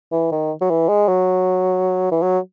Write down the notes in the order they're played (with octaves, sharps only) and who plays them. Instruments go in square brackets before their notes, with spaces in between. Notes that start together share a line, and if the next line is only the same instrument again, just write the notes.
[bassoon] E3
D#3
F#3
E3
G#3
F#3
E3
F#3